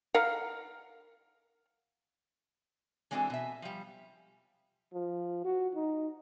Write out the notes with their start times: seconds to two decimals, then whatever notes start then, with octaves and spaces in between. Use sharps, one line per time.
0.14 A#4 F5 F#5
3.11 E3 G#3 C4 D4 F#4 A4
3.30 B2 E5
3.62 F3 G3
4.93 F3
5.45 F#4
5.75 D#4